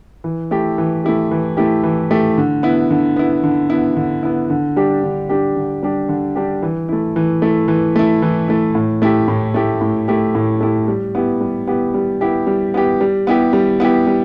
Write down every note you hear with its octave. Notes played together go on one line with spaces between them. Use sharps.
E3
A3 E4 G4
E3
A3 E4 G4
E3
A3 E4 G4
E3
A3 E4 G4
D3
B3 E4
D3
B3 E4
D3
B3 E4
D3
B3 E4
D3
G3 D4 G4
D3
G3 D4 G4
D3
G3 D4 G4
D3
G3 D4 G4
E3
A3 E4
E3
A3 E4
E3
A3 E4
E3
A3 E4
A2
A3 E4 G4
A2
A3 E4 G4
A2
A3 E4 G4
A2
A3 E4 G4
G3
B3 E4 G4
G3
B3 E4 G4
G3
B3 E4 G4
G3
B3 E4 G4
G3
B3 E4 G4
G3
B3 E4 G4
G3